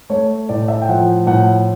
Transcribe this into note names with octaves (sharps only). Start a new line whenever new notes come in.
A3 C#5
A2 D5
E5
G5
F3 F#5
A2 F#5